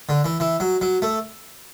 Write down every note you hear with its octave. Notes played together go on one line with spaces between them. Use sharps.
D3
E3
E3
F#3
F#3
A3